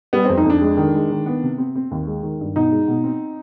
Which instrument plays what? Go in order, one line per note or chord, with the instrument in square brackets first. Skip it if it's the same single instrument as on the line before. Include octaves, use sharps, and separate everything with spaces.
[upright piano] G3 [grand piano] B3
[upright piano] F2 [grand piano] C4
[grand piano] D#4
[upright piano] F2
[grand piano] D4
[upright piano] G#3
D#3
G#3
D#3
B3
C3
C4
C4
D#2
G#3
D#3
G2
[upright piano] B2 [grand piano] D#4
[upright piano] G#3
B2
C4